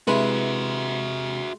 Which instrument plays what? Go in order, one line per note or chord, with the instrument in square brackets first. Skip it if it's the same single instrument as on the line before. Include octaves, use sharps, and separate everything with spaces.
[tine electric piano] C3 [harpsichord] G#3 [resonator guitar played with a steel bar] E4 B4 [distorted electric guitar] F#4 E5